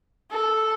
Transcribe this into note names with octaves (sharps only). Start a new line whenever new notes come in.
A4